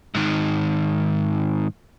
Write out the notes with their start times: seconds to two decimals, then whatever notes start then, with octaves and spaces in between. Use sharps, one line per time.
0.15 G#2 D#3